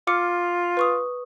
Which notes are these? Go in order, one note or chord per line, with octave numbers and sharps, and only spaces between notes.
F4 D6 F6 C#7
B4 C#6 D#6